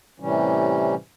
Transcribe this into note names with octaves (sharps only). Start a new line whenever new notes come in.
A2 C3 E3 G3 C#4